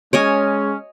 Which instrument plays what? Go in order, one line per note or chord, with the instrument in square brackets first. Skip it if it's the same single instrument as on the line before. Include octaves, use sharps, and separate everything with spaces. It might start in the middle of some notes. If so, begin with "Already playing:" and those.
[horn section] G#3 C#4 [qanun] C#5 D#5 G#5